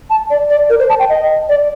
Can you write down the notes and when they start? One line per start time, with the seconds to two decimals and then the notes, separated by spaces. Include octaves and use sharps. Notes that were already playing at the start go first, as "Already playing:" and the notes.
0.10 A5
0.30 D5
0.50 D5
0.70 A#4
0.79 C5
0.89 A5
0.99 G5
1.09 D#5
1.49 D5